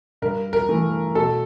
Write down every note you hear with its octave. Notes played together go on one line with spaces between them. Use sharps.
G2 A#4
A#4
E3 A3
B2 A4